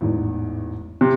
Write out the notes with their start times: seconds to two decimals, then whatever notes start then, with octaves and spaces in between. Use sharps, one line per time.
0.01 A1 E2 G#2
1.01 C3